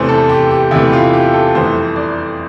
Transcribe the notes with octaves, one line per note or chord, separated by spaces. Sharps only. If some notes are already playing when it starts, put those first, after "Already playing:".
Already playing: E2 C3 E3 A3 C5
A4
G4
G4
E2 C3 E3 A3 E4
F4
G4
A4
G1 F2 E3 A3 C5
D5